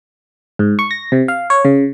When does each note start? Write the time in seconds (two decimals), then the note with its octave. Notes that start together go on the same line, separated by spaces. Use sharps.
0.59 G#2
0.79 C#6
0.91 A#6
1.12 C3
1.28 F5
1.50 C#5
1.65 C#3